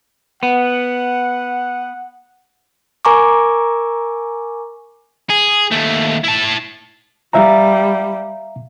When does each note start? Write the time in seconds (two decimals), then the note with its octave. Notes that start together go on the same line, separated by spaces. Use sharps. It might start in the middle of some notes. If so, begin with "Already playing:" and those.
0.43 B3 F#5
3.05 A#4 G#5 A#5 C#6 D6
5.30 G#4
5.71 D#2 A3
6.24 E4 A5
7.33 G3 E5 F5 A#5